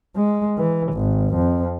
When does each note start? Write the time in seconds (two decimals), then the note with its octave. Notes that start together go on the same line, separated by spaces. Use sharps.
0.15 G#3
0.58 E3
0.93 G#1
1.35 F2